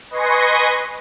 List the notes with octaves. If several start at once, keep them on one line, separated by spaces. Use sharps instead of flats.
B4 D#5 G#5 C6 C#6 A#6